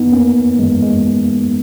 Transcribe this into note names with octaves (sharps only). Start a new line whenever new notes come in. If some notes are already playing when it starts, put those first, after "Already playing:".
Already playing: G2 E3 B3 D#4
A#3 C#4
G2 E3 G#3
G#3